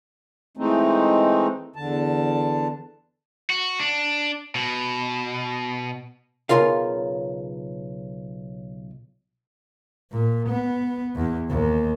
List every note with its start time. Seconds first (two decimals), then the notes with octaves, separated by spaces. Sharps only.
0.57 E3 G#3 A3 C4 D#4
1.76 E2 D3 A5
3.50 F#4
3.80 D4
4.55 B2
6.49 B1 E2 C#3 F4 A#4 F5
10.12 A#2
10.50 B3
11.15 E2
11.50 D#2